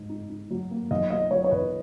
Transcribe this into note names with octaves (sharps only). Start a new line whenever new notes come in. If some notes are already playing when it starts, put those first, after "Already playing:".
Already playing: G#2
D#4
D#4
F#3
A#3
B1 D#5
F#3 D#5
F#3 C#5
C#5
B1 B4